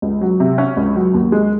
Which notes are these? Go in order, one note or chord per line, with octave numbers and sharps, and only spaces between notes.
C#2
F#3
C3
C#4
C#2
F#3
D#2
G#3